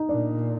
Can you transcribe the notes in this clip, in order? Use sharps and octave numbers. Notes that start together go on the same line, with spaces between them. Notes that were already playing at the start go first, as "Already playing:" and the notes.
Already playing: D#4 D#5
A#2 D4 D5